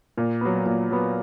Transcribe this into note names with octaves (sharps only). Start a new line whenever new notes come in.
A#2
F#3 B3
A#2
F#3 B3